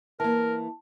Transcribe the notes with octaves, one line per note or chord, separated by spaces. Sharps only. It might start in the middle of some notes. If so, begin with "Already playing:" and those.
E3 A#3 A#4 A5